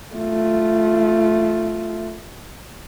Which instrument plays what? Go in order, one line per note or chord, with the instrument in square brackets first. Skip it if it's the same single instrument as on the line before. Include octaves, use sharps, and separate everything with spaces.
[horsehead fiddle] A3 F4